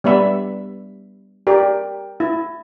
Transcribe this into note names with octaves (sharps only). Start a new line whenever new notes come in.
G3 B3 D5 E5 B5
G4 A#4 D5
E4